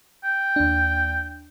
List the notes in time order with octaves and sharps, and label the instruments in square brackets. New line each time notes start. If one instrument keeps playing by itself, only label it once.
[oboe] G5
[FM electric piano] D#2 D4